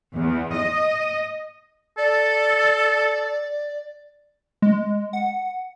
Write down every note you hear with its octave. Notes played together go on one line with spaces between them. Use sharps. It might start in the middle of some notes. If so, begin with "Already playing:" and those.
E2
D#5
A4 D5
G#3
F#5